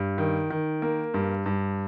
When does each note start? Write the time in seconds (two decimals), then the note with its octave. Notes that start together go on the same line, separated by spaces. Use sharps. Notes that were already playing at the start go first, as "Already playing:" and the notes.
Already playing: G2
0.18 D#3
0.50 D#3
0.82 A#3
1.14 G2
1.46 G2